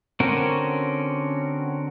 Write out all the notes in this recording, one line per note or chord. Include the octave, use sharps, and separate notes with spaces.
D3 C4 C#4 F#4 A#4